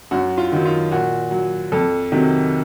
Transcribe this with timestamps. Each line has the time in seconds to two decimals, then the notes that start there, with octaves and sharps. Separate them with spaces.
0.11 F#2 F#4
0.38 F4
0.52 D#3 F#3
0.65 F4
0.92 A#2 F#4
1.31 F#3
1.72 F2 A4
2.12 C3 D#3 F#3